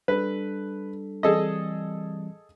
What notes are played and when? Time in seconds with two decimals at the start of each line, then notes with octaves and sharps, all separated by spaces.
0.08 G3 D4 A4 B4
1.23 E3 G3 C4 G#4 A4 D#5